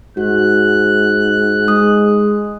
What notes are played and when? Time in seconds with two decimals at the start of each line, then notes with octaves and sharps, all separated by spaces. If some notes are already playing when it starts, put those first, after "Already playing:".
0.17 G#2 F#4 F#6
1.68 G#3 D#6